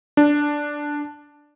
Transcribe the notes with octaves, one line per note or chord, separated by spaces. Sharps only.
D4